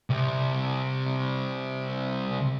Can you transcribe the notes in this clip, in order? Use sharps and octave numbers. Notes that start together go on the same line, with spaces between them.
C2 C3